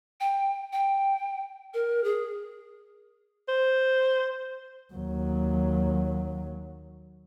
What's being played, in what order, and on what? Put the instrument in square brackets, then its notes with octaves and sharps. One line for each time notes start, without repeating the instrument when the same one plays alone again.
[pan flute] G5
G5
A#4
G#4
[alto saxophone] C5
[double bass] D#2 F#3